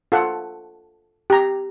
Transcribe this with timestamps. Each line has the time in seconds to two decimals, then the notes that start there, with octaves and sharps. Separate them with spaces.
0.12 F4 A4 F#5
1.30 G4 A#5